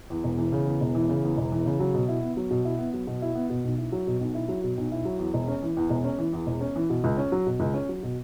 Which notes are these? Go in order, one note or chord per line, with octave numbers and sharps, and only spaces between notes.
E2
E1
E3
C#3
E2
E1
E3
C#3
E2
E1
E3
C#3
F#3
B2
E4
B3
F#3
B2
E4
B3
F#3
B2
E4
B3
B2
B1
E4
F#3
B2
B1
E4
F#3
B2
B1
E4
F#3
E2
E1
C#4
E3
E2
E1
C#4
E3
E2
E1
C#4
E3
B2
C#2
C#4
F#3
B2
C#2
C#4
F#3
B2